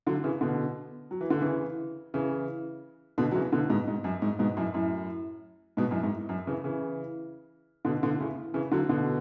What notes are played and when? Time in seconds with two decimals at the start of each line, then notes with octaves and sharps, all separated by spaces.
0.07 D3 F#3
0.24 C#3 E3
0.41 B2 D3
1.11 F#3
1.21 E3
1.30 D3
1.40 C#3 E3
2.14 C#3 E3
3.18 B2 D3
3.31 F#3
3.35 C#3 E3
3.52 B2 D3
3.69 G#2 B2
3.88 G#2
4.04 F#2
4.22 G#2
4.39 G#2 B2
4.57 F#2 A2
4.74 F#2 A2
5.77 G#2 B2
5.91 F#2 A2
6.03 G#2
6.29 F#2
6.47 C#3 E3
6.64 C#3 E3
7.85 B2 D3
8.03 B2 D3
8.20 A2 C#3
8.54 C#3 E3
8.71 D3 F#3
8.89 B2 D3